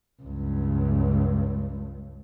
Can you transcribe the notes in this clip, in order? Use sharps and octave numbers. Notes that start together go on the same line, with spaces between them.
C#2 G2